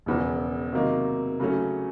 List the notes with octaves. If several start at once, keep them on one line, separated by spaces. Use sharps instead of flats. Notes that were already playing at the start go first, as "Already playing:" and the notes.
E1 E2 C#3 F3
C3 D#3 F#3 A#3
C#3 F#3 A3 C#4